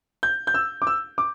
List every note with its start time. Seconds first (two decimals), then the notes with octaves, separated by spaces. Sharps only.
0.23 G6
0.47 G6
0.54 E6
0.82 D6
0.87 E6
1.18 D6